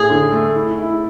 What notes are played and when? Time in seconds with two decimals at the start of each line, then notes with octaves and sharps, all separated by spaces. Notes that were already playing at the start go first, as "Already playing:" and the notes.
Already playing: A2 G#4
0.10 D3
0.32 A3
0.56 E4
0.79 E4